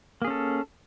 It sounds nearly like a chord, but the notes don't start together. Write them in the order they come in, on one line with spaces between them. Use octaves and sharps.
A#3 G#4 C#4 A4